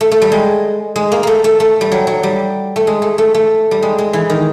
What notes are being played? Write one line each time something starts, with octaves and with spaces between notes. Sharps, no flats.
A3
A3
G3
G#3
G#3
A#3
A3 A#3
A3
A3
G3
F#3
F#3
G3
A3
G#3
A3
A3
A3
G3
G#3
G#3
E3
D#3